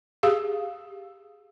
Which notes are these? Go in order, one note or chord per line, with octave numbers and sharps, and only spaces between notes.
G4 G#4 F5